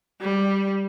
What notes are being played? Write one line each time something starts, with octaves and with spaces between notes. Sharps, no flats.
G3